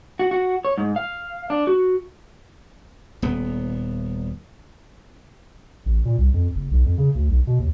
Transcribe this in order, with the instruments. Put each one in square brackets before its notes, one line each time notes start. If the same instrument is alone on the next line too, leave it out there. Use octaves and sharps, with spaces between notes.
[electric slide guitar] F#4
F#4
C#5
G#2
F5
D4
F#4
[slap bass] D#1 B3
[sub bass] A1
A#2
C2
F2
F#1
B1
F2
C#3
D2
B1
B2
D#2